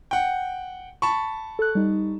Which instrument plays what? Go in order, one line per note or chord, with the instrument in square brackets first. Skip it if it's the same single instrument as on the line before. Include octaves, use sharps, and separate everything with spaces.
[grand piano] F#5 G5
A5 B5 C#6
[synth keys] A4 F#6
G3 D#4